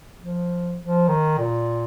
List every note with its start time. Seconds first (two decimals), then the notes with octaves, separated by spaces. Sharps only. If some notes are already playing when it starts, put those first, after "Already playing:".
0.21 F3
0.79 F3
1.08 D#3
1.38 A#2